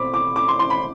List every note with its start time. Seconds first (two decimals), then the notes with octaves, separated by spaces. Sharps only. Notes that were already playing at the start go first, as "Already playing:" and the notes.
Already playing: B2 C4 C5 B5 D6
0.14 D6
0.36 D6
0.48 C6
0.59 C6
0.70 B5